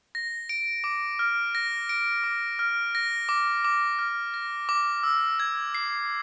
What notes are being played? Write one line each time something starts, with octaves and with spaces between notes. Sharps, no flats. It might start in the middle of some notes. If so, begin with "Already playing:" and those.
A#6
D7
D6
F6
A#6
D7
D6
F6
A#6
D6
D6
F6
A#6
D6
E6
G#6
C7